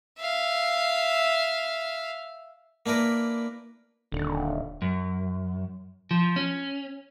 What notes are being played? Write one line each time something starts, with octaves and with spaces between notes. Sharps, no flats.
E5 F5
A#3 D4 E4 A#4 B4
D#1 D3
F#2
F3
C#4